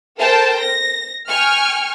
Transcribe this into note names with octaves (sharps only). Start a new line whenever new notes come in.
A4 A#4 C5 G5 A5
A#6
G5 G#5 C#6 F6